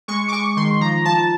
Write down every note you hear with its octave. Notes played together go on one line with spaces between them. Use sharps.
G#3 C#6
D6
G#3 C#6
D#3 C6
F3 A#5
F3 A5